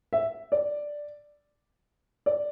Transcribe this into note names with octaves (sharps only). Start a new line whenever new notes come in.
E5
D5
D5